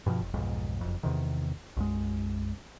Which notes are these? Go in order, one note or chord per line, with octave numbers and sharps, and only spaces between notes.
G2 B2 E3 F3
F1
B1 F2 G#2
F#1 F2
E2 C3 D#3
B1 F#2 G#3